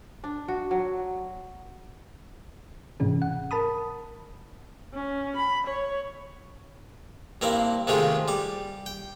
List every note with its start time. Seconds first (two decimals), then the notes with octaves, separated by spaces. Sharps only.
0.24 D4
0.48 F#4
0.71 F#3
3.00 G#2 C3 E3 C#4 G#4
3.22 F#5
3.51 A#4 A5 B5 D#6
4.94 C#4
5.36 B5
5.66 C#5
7.41 G2 A#3 C4 E4
7.87 G#2 C3 D#3 G#3 A3 F4
8.28 G3 D6
8.86 G5